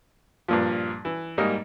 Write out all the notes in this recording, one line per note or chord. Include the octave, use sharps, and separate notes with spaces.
G2 A#2 F3
E3
G#2 G3 A#3 D#5 F6